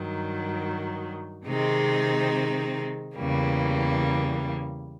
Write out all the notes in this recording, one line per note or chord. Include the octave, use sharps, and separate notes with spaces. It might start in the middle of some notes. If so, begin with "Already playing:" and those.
Already playing: G2 D#3 F#3
C3 D#3 G#3 C4 D#4
E2 C#3 E3 G3 A#3